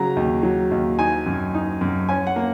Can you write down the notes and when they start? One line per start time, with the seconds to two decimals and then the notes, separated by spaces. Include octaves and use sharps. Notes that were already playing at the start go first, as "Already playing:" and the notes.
Already playing: C#3 F#3 A#5
0.16 D#2
0.43 F#3
0.71 D#2
0.99 D#4 G#5
1.26 F#2
1.54 D#4
1.81 F#2
2.09 C#4 G#5
2.27 F#5
2.36 A#3